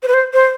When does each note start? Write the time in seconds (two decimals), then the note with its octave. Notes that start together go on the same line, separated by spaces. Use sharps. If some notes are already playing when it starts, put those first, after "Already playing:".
0.03 C5
0.08 B4
0.14 C5
0.33 C5